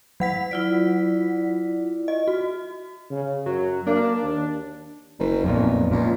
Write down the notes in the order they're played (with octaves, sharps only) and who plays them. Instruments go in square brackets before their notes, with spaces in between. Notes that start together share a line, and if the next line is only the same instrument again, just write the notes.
[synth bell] F#3 F#5 B6
[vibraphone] E4 F4 D5
[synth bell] D#5
F#4
[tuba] C#3
[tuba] F#2 [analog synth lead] F#3
[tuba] A#3 [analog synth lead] D4
[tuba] D#2
[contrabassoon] F#1
[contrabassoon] B1 [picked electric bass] F2 A#2
[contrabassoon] C#2 [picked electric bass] A#2